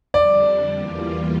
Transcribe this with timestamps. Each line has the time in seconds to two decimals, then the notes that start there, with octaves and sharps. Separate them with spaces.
0.14 F2 D3 G3 D4 D5
0.72 E2 E3 G3 A#3 F4